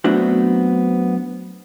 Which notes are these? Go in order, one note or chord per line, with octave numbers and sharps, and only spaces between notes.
F#3 A3 B3 C4 D4 F#4